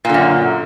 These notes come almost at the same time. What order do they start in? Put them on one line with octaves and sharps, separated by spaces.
A#2 D3 F#2